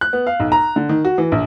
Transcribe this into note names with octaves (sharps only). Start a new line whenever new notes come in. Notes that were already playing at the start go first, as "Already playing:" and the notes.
F#6
B3
F5
B1
A#5
D3
D#3
F#4
E3
A#1